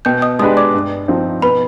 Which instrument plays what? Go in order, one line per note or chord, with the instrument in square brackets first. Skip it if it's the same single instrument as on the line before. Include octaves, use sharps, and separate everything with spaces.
[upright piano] B2 [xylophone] G5 G6
[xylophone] D#5 D#6
[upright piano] G#3 D4 G4 B4 [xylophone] D#5 D#6
[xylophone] D5 D6
[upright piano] G2
F3 C4 D#4
[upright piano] B2 [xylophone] B4 B5